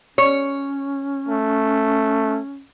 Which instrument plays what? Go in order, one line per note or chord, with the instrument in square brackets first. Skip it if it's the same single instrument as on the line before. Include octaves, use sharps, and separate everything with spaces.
[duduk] C#4 [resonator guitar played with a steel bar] C#5
[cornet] A3